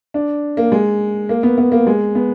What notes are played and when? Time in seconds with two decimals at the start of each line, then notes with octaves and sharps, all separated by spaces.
0.14 D4
0.57 A#3
0.72 G#3
1.29 A#3
1.43 B3
1.58 B3
1.72 A#3
1.87 G#3
2.15 B3